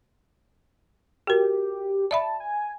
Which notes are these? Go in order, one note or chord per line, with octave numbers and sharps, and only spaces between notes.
F#4 G4 A#4
D5 E5 A5 B5
G#5